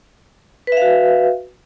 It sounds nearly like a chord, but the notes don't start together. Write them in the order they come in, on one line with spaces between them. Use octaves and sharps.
B4 E5 F5 F#4